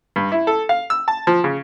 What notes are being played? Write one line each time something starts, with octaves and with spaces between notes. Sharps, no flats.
G2
E4
A4
F5
E6
A5
F3
C#3